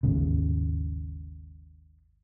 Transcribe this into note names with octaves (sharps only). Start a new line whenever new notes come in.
G#1 D#2 G#2 C#3